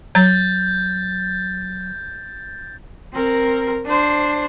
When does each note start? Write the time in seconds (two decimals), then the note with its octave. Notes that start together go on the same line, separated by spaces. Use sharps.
0.15 F#3 G6 A6
3.14 C4 A#4
3.86 D4 C5